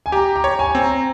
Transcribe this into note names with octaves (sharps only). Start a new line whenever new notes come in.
G#5
G4 A#5
A#5
C#5
G#5
C4
A#5